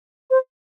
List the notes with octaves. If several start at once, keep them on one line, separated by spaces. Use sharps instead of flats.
C5